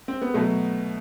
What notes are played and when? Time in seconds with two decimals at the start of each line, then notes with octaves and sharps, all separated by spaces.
0.08 C4
0.22 B3
0.34 B2 F#3 A3